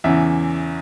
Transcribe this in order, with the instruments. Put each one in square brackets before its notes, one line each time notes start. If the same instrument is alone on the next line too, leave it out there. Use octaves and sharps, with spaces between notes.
[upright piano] E2 C#3 E3 E5